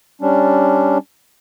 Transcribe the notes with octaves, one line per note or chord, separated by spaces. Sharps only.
G3 C#4 D4